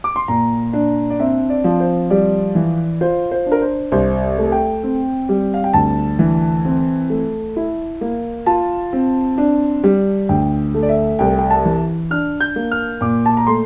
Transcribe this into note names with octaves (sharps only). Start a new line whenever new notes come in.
D6
C6
A#2 A#5
D4
D5
C4 E5
D5
F3
C5
G3 D5
E3
F4 C5
C5
D4
A#4
C5
C2 C5
A3
G5
C4
G3
F5
G5
D2 A5
E3
C4
A3
E4
A#3
F4 A5
C4
D4
G3
D2 G5
A3
D5
E5
C2 G5
G5
A5
E3
D4 F6
G6
A#3
F6
A#2 D6
A5
A#5
A3 C6